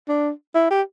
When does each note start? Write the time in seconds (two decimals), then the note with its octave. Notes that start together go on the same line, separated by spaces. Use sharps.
0.08 D4
0.55 E4
0.71 G4